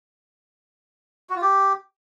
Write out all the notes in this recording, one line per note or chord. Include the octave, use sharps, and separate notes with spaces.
F#4
F4
G4